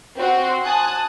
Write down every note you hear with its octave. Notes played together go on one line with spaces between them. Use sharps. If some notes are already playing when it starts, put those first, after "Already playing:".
C4 F#4 C6
G#5 A5 D#6 F#6